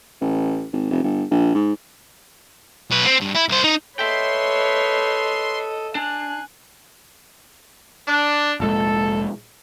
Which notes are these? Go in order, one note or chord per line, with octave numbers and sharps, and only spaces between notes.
A1
G#1
F1
G1
A#1
G#2
B1 B4
C4
G2
E4
C2 C5
D#4
A4 B4 C#5 D#5 E5 G5 C6
D4 G#5 F#6
D4
F1 A#2 G#3 A4